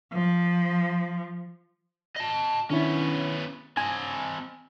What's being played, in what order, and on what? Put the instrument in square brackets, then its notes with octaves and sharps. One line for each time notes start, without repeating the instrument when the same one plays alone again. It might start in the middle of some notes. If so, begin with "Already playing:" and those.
[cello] F3
[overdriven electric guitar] D#5 A5
[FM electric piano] D#3 D4 E4 [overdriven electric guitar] B3 C#4
[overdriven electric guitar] C4 D#5 [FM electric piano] G#5